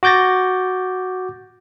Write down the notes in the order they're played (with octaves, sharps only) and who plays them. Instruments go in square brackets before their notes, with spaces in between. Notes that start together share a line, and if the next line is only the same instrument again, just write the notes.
[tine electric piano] F#4 D6 G6 A6 A#6